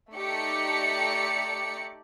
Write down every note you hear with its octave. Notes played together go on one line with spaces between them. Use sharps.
A3 D#4 G4 D5 C#7